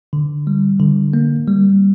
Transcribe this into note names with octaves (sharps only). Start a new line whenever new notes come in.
D3
G3
D3
A#3
G3